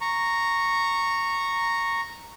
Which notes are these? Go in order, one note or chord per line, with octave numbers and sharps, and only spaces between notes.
A#5 C#6